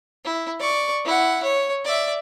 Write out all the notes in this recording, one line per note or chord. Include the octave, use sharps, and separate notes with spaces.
E4
D5 C#6
E4 F#5
C#5
D5 E5